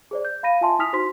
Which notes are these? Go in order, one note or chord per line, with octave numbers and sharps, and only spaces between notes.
G#4 C5 D5
G6
F5 B5 A#6 D#7
F4 E5 G#5 A5 C6
E4 G#5 D#6 F6 B6 F7
D#4 F#4 C5 C6 B6